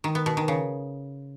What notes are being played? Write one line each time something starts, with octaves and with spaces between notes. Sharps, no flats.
D#3
B3
B2
D#3
C#3